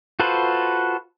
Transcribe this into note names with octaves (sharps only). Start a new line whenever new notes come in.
F4 F#4 A4 B4 C5